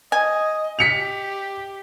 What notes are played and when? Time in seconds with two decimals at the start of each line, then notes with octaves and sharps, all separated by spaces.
0.12 D#5 G#5
0.79 G4 B6 C#7 F7